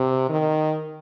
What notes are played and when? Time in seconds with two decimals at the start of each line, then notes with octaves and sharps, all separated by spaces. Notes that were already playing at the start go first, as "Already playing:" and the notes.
Already playing: C3
0.29 D#3